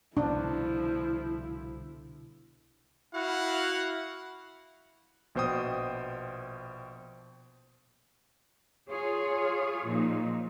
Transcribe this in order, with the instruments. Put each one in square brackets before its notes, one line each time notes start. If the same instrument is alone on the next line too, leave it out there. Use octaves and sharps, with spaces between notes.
[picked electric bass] C2 B2 D3 [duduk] F3 [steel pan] D4 [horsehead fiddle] E4
[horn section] E4 F#4 F5 F#5
[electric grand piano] A#1 B2 C5 G5 D#6
[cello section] F4 G#4 C#5
A#2 F3 D#4